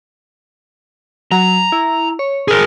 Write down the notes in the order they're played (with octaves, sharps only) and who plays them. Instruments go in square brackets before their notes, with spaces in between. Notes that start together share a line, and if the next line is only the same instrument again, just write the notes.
[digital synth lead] F#3 [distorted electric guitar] A#5
[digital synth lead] E4
C#5
[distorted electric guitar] G#4 A#4